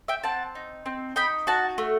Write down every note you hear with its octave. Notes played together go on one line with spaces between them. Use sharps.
E5 G5
C4 F#5 A5
D#4
C4
D#4 G5 B5
F#4 F#5 A5
A3